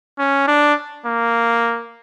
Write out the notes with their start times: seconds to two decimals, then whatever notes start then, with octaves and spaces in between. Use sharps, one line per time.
0.19 C#4
0.47 D4
1.06 A#3